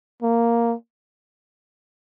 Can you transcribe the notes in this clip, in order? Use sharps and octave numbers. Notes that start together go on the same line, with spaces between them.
A#3